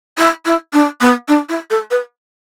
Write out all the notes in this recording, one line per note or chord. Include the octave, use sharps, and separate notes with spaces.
E4
E4
D4
B3
D4
E4
A4
B4